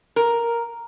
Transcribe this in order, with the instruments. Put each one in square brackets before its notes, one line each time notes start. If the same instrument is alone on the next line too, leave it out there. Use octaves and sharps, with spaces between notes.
[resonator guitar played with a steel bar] A#4